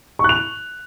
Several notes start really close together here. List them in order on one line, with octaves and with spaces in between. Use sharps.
C#6 F#6 F7